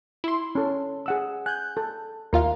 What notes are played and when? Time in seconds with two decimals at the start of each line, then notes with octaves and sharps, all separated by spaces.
0.24 E4 C6
0.55 C#4 A4
1.06 G#4 F#5 E6
1.46 G#5 F#6 G6
1.77 A4
2.33 D#2 F4 A#4 E5 F5